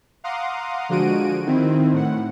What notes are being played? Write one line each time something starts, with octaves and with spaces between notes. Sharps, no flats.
F5 F#5 A#5 C6 D6 D#6
D3 F3 G#3 F#4 D7 D#7
D#3 C4 E4
A2 F#5